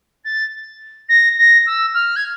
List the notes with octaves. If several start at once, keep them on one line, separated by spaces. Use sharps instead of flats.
A6
A#6
A#6
E6
F6
G#6